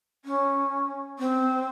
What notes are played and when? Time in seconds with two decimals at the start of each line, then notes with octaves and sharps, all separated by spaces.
0.25 C#4
1.19 C4